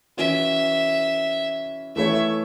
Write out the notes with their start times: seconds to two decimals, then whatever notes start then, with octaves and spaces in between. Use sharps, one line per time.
0.17 E3 C#4 F#4 E5
1.96 E3 A3 E4 A4 C#5 E5